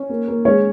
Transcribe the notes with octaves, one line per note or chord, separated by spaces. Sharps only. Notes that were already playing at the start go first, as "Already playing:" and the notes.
Already playing: C#4
A#3
A#3
G#3 C#4 C#5